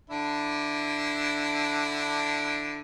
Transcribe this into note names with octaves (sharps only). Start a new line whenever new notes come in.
D3 D4 E4